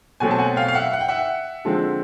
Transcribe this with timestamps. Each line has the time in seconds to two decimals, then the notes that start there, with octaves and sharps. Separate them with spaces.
0.20 B2 F#3 A3 C4 F#5 G#5
0.31 A5
0.38 F#5 G#5
0.56 F5 G5
0.68 F5
0.75 E5 F#5
0.93 F#5
1.01 G5
1.08 E5 F#5
1.65 D3 F3 G#3 C4